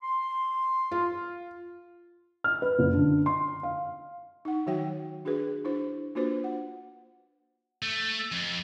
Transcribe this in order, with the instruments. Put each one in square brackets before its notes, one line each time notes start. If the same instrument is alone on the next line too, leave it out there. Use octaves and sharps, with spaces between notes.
[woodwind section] C6
[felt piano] F4
F6
B4
F#1
D3
C6
F5
[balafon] D#4 F#5
D#3 F#3 F#4 C#5 E5 G5
D4 F#4 G#4 B4
D4 E4 C5
A#3 D4 F4 F#4 B4 C5
F#5
[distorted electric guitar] A3
F2